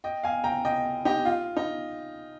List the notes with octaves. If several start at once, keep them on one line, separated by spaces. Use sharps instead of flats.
D#5 G5
F5 G#5
G5 A#5
D#5 G5
D#4 G4
F4
D#4